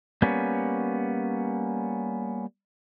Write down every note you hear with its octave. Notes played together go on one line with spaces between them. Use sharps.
G3 A#3 B3 C#4